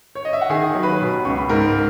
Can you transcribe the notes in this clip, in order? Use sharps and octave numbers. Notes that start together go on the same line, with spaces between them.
C#5
D#5
E5
F#5
D#3 G#4 G#5
F#3
B4 B5
B2
C#2 C#6
B5
G#2 A#4 A#5